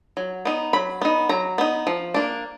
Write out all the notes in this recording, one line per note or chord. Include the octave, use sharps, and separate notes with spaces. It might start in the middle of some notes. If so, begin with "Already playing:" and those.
F#3
B3 D#4
F#3 B5
B3 D#4
F#3 A#5
B3 D#4
F3
A#3 D4